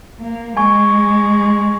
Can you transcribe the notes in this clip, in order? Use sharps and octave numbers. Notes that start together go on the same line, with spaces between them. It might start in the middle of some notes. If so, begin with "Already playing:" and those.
A#3
G#3 G#5 C#6 G#6